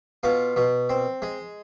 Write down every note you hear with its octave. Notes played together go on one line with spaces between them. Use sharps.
B2 F4
B2
C4
G#3